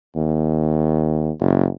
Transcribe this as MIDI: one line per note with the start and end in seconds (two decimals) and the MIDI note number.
0.16 1.31 39
1.41 1.68 30